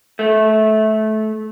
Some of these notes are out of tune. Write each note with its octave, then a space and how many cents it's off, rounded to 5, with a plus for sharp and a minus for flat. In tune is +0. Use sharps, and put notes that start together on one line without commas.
A3 -20